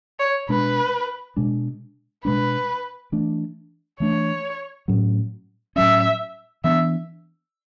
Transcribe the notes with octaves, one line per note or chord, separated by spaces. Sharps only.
C#5
B2 G#3 D4 B4
B2 G#3 D4
B2 G#3 D4 B4
E3 A3 D4
E3 A3 D4 C#5
A2 F#3 C#4
A2 F#3 C#4 E5
E3 B3 D4 E5